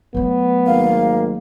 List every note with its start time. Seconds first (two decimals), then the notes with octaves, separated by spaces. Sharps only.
0.14 F#3 A3 B3
0.66 G#1 A#3 F5